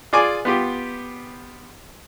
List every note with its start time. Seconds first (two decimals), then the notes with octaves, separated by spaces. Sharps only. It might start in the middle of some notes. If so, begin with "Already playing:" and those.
0.13 F4 G#4 D5 G#5 D6
0.45 B3 F4 G4